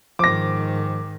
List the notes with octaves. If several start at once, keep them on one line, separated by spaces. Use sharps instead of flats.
G#2 D#3 F3 C5 D6 A#6